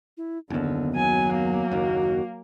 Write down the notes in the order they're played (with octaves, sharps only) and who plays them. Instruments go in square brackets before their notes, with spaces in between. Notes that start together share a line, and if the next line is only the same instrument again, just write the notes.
[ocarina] E4
[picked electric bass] F#1 D#2 [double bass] D3 [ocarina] B3
[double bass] F#3 [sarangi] G#5
[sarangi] A#3
[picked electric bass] F#1 D#2 [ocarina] F#4